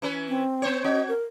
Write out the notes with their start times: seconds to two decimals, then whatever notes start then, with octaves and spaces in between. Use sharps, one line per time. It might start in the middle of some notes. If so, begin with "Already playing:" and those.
0.02 E3 C#4 B4
0.28 C4
0.62 B3 C5 C#5
0.84 C4 F#4 D#5
1.09 A#4